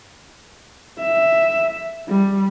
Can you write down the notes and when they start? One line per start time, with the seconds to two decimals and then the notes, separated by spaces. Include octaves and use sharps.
0.99 E5
2.08 G3